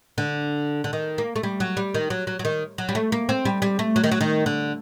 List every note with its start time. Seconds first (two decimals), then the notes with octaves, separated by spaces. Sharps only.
0.18 D3
0.84 D3
0.93 D#3
1.18 A#3
1.36 A3
1.43 G3
1.60 F#3
1.77 G3
1.94 D#3
2.10 F#3
2.27 F#3
2.39 F#3
2.45 D#3
2.78 F#3
2.89 G3
2.95 A3
3.12 A#3
3.29 C4
3.45 G3
3.62 G3
3.79 A3
3.96 F#3
4.04 D#3
4.12 F#3
4.21 D#3
4.46 D3